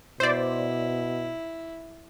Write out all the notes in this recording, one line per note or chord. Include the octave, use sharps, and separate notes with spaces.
B2 E4 C5 D5